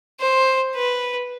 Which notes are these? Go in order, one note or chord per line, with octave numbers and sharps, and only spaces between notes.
C5
B4